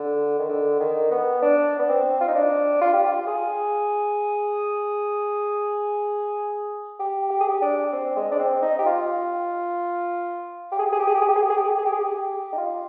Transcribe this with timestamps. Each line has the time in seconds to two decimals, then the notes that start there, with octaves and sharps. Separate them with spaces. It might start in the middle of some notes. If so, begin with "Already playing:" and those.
Already playing: D3
0.39 D#3
0.49 D3
0.80 D#3
1.11 B3
1.42 D4
1.79 B3
1.89 C4
2.21 F4
2.28 D#4
2.35 D4
2.81 F4
2.93 G4
3.06 F4
3.27 G#4
6.99 G4
7.30 G4
7.41 G#4
7.49 G4
7.62 D4
7.92 C4
8.16 G#3
8.32 D4
8.39 C4
8.62 D#4
8.79 G4
8.86 F4
10.72 G4
10.79 G#4
10.86 G4
10.92 G#4
11.00 G4
11.07 G#4
11.14 G4
11.22 G#4
11.29 G4
11.36 G#4
11.43 G4
11.50 G#4
11.57 G4
11.64 G#4
11.71 G4
11.78 G#4
11.85 G4
11.92 G#4
12.00 G4
12.53 D#4
12.58 F4